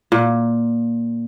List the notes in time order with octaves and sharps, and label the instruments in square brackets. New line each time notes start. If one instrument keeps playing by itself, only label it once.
[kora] A#2